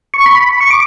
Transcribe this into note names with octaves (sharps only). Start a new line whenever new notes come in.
C#6
B5
C#6
D6